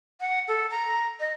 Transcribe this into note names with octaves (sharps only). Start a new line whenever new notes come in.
F#5
A4
A#5
D#5